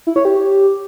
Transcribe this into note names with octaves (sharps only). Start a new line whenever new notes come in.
E4
C#5
G4